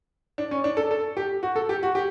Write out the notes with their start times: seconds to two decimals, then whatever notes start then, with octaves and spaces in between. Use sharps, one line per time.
0.38 D4
0.51 C#4
0.64 D4
0.77 A4
0.91 A4
1.17 G4
1.43 F#4
1.56 A4
1.69 G4
1.83 F#4
1.95 G4